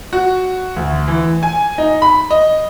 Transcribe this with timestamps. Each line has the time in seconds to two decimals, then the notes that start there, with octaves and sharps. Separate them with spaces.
0.13 F#4
0.76 D2
1.08 E3
1.43 G#5
1.78 D#4
2.02 B5
2.31 D#5